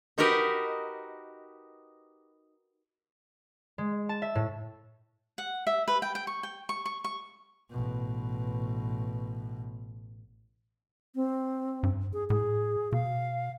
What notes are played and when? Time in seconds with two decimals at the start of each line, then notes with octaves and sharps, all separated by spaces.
0.18 D#4 F#4 G4 A#4 B4 D#5
3.78 G#3
4.09 A5
4.22 E5
4.35 A2
5.38 F#5
5.67 E5
5.88 B4
6.02 G5
6.15 G5
6.27 C#6
6.43 G5
6.69 C#6
6.86 C#6
7.04 C#6
7.70 A1 B2
11.15 C4
11.83 G2
12.13 G#4
12.30 A2 G#4
12.92 B2 F5